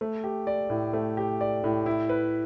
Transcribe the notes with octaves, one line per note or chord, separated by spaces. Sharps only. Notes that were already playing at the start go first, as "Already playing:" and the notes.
A3
G4
D5
A2
A3
G4
D5
A2
E4
B4